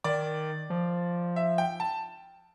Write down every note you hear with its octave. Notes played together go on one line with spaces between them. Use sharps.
D#3 D5
F3
E5
G5
A5